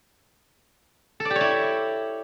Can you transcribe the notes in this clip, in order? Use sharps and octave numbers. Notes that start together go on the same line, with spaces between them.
A4
D5
G4
C#5
E4